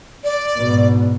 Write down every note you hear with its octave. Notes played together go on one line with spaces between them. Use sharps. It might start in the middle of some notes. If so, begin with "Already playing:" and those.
D5
G#2 B2